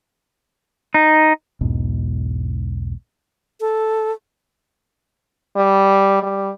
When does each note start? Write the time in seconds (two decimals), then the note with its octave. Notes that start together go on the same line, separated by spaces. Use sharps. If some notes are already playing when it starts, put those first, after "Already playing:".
0.94 D#4
1.61 B1 E2 G#2 B2
3.61 A4
5.56 G3
6.23 G3